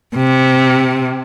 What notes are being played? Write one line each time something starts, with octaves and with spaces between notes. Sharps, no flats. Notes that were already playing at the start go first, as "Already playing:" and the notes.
C3